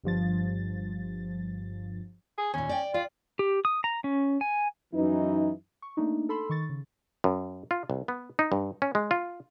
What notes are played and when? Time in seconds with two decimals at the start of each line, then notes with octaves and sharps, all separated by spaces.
0.04 G1 G2 F3 A6
2.38 G#4
2.54 D#2 A#2 C#4
2.69 D5 G5
2.94 F4 D5
3.39 G4
3.65 D#6
3.84 A#5
4.04 C#4
4.41 G#5
4.93 F#2 E3 D#4
5.82 C#6
5.97 A3 A#3 D4 D#4
6.29 A4 B5 C6 E6
6.50 D#3 C#6 A6
6.69 C#3
7.24 F#2
7.71 F4
7.90 C2
8.08 B3
8.39 D#4
8.52 G2
8.82 C#4
8.95 G#3
9.11 F4